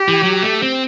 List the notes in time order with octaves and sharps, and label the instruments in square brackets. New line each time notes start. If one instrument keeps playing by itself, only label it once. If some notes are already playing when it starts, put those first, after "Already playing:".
Already playing: [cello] G4
[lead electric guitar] E3
F#3
A3
C4